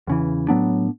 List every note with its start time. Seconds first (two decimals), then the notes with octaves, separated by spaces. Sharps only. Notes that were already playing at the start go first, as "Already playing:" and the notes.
0.07 E2 C#3 E3
0.48 A2 F#3 B3 D4